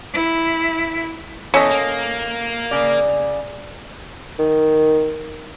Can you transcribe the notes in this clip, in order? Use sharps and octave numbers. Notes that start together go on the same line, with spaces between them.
E4
E2 C#4 A4 D#5
A#3
C#3 D5
D#3